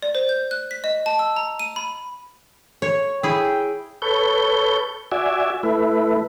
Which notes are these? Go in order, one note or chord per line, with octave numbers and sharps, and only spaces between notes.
D5
C5
G6
F#6
B6
D#5
A5
E6
A#5
D#7
B5
C#5
E4 G#4 G5
A4 B4 C#5 G6
F#4 D5 E5 G#5
A3 E4 B4